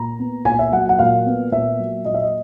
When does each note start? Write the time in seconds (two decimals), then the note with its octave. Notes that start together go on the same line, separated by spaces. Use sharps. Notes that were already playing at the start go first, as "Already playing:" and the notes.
Already playing: A#2 A#5
0.19 B3
0.45 A#2 G#5
0.59 E5
0.72 F#3 F#5
0.89 F#5
0.99 A#2 F5
1.26 B3
1.52 A#2 E5
1.79 F#3
2.05 A#2 D#5
2.14 E5
2.22 D#5